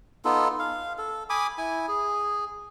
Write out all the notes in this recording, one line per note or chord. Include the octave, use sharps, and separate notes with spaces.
B3 D#4 F4 A4
F5
A4
G#5 B5 D6 D#6
E4 G#5
G#4